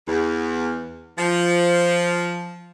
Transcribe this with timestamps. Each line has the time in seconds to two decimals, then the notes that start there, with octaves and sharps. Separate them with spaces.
0.08 E2
1.18 F3